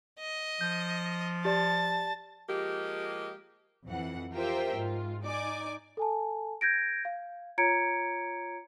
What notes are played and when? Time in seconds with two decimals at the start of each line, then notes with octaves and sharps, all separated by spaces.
0.20 D#5
0.61 F3 G6
1.45 G4 D5 A5 A6
2.48 F3 G#3 A#3 G4
3.87 F2 E3 F#5
4.35 F4 G4 A#4 C5 E5 G5
4.76 G#2 F4
5.23 D#4 D5 G#5 D6
5.97 A4 G#5 A5
6.61 G6 G#6 A#6 D7
7.05 F5
7.58 F4 C#5 A#5 G#6 C#7 D7